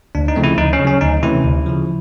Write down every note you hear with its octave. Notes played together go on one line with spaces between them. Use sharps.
D2 D4
D#4
C#3 F3 A3 C4
E4
D2 D#4
C#4
C#3
F#3 C#4
D2 D#4
C3 E3 A3 C#4 E4
D2
C#3 F3